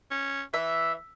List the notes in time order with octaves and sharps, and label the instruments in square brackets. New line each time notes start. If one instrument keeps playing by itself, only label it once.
[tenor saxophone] C#4
[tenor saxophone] E3 [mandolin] E5